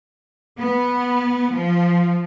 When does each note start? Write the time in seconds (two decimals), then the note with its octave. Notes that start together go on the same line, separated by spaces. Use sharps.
0.59 B3
1.54 F3